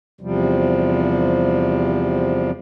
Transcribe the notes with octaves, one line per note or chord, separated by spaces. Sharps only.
E2 C3 F3 G3